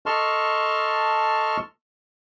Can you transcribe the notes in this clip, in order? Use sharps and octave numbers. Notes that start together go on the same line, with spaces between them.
A4 D#5 A5 C6 C#6 F6